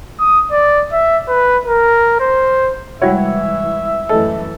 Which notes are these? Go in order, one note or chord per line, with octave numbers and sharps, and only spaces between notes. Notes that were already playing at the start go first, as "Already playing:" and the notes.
D#6
D5
E5
B4
A#4
C5
C3 E3 G3 G#3 E4 F#4 C#5 E5
F#2 E3 A3 A4 D#5